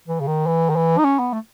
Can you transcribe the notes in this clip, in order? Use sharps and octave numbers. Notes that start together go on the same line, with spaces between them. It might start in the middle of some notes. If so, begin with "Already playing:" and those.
E3
C#3
D#3
E3
D#3
E3
D#4
C#4
B3
A3